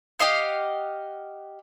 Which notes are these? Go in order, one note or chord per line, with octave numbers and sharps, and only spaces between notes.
G4 D#5 F5 F#5